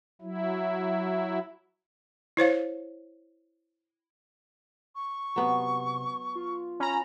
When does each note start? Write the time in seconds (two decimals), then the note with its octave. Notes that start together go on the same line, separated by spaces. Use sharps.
0.21 F#3 E4
2.37 E4 C5 C#5 F5
4.95 C#6
5.36 C3 F#3 B3
6.35 F4
6.80 C#4 A#5 B5